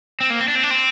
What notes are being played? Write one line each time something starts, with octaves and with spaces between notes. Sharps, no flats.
C4
A#3
C4
D4
C4
D4
C4